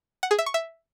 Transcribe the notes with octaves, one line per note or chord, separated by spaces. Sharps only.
F#5
G#4
E5
C#6
E5